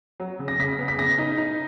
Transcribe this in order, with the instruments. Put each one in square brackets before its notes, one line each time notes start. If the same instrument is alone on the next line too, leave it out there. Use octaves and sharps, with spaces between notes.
[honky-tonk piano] F#3
C#3
[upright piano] A#6
[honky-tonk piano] C#3 [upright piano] B6
[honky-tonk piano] B3
[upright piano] B6
[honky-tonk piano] C#3 [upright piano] A#6
[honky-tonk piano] D#4
D#4